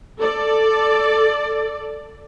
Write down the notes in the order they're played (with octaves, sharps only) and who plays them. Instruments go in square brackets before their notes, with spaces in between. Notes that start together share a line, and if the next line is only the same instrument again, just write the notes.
[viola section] A4 D5